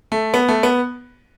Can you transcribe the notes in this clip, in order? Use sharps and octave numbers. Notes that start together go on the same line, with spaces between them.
A3
B3
A3
B3